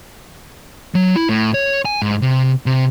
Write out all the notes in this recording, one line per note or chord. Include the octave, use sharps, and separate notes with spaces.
F#3
E4
A2
C#5
G#5
G#2
C3
C3